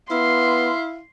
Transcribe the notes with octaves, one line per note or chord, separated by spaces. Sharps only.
B3 E4 F5 C6